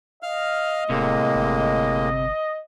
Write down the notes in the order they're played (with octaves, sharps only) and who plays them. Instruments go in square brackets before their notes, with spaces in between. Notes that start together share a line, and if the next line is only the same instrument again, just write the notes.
[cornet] D#5 [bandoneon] F5 F6
[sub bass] D1 [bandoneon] A2 G#3 A#3 [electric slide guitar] C3
[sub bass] G1